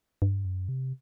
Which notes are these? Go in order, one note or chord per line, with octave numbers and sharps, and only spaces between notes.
G2
F#2
C3